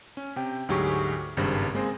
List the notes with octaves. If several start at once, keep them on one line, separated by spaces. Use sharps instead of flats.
C#4
C3 G5
D2 G#2 F#3 G4 G#4 C#6
G#1 G2 C#3 G3 C5 A#6
G#3 A#3 C4 G#4 C5